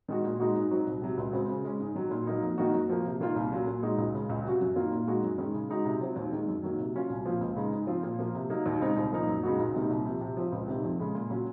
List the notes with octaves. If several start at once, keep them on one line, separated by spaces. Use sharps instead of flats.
D#3 G#3 D#4 F#4
A#2
G#3 D#4 F#4
G#2
F#3 C4 D#4 F#4
C2
C3 F#3
C#2
C#3 G#3 C4 F#4
C#3
G#3 C#4
G#2
D#3 F#3
A#2
F#3 A#3 D#4
F2
D#3 A#3 D#4 F#4
F#2
F3 A#3
C3
D#3 A#3 F4
C2
A#2 F#3 C#4
A#2
G#3 D#4 F#4
C#2
C#3 G#3 C#4
C#2
C3 F#3 C#4 F#4
F#2
D#3 A#3 F4
A#2
G#3 D#4 F#4
F#2
D#3 G#3 C#4
C#3
G#3 D#4 F#4
C3
F#3 C4 F4
D#2
D#3 G#3
F#2
D#3 F#3 A#3
C3
F#3 C#4 F4
C2
A#2 F3 C4 F4
C#2
C#3 G#3 D#4
G#2
F3 C4 F4
A#2
F3 A#3 F4
C3
F#3 A#3 D#4
D#2
C#3 G#3 C4 D#4
C2
A#2 F3 A#3 D#4
F#2
C#3 G#3 D#4 F#4
C#2
C3 D#3 A#3 D#4
C2
C3 F3
C3
F3 C4
C#2
C3 D#3
F2
C#3 G#3
A#2
F#3 C#4 F4